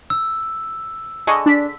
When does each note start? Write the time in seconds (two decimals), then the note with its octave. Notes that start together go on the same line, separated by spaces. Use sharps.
0.10 E6
1.27 D3 G#4 D#5 C#6
1.46 D4 B6